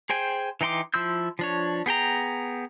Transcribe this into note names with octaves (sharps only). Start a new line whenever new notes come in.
G#4 C5 G5 G#5
E3 D#4 G5 C6 D6
F3 E4 C6 E6 G6
F3 D4 C#5
B3 G#4 G5 A#5